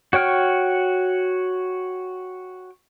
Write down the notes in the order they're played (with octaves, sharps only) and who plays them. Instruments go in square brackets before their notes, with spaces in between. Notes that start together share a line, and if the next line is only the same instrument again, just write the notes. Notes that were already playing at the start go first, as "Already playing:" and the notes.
[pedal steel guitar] F#4 C#5 G5 F6